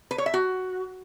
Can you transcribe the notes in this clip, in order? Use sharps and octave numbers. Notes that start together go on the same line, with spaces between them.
B4
C#5
E5
F#4